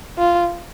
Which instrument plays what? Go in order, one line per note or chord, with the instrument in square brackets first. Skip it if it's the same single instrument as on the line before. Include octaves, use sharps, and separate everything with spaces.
[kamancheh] F4